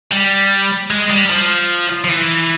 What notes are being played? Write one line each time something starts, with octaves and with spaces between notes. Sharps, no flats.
G3
G#3
G3
F3
F3
E3